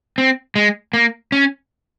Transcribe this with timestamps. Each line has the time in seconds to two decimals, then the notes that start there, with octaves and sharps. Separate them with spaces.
0.18 C4
0.56 G#3
0.93 A#3
1.32 C#4